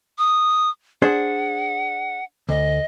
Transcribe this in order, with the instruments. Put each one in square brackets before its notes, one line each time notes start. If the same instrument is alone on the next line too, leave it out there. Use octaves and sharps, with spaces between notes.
[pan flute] D#6
[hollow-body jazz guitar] D4 G#4 C5 [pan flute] F#5
[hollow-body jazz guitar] D2 [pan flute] D#5